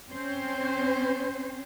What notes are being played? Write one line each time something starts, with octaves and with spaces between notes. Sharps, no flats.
C4 C#4 C5